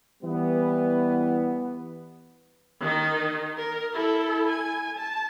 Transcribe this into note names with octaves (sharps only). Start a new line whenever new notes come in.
E3 G3 B3
D#3 D#4
A#4
E4 A4
G#5
A5